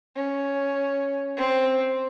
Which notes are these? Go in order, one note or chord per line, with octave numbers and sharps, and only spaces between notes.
C#4
C4